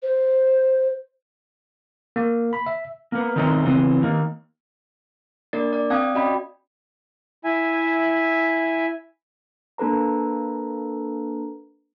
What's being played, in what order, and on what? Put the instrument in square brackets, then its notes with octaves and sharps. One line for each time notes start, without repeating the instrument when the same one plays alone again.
[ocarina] C5
[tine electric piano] A#3
B5
E5
[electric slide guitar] A#3 B3
D#3 F#3 A3 C4 C#4 D#4
C#3 E3 B3 C4
D#3 A#3
[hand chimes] A#3 D4 A#4 D5 A6
D5
C4 F5 G5 A5 D#6 G#6
C#4 F#4 D5 D#5 G5 B5
[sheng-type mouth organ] E4 E5 G#5
[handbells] A#3 D4 A4 B4 A#5